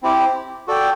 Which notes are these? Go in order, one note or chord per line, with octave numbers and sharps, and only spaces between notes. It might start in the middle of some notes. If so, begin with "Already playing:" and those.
C4 E4 G4
F#4 A4 D5 G5